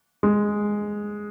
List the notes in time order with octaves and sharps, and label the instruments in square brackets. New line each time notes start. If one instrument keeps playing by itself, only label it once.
[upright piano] G#3